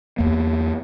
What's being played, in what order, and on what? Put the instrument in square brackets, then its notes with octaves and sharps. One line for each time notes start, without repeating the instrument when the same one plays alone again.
[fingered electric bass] E2 A#3